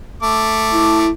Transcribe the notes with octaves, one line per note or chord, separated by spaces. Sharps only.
A3 D6
E4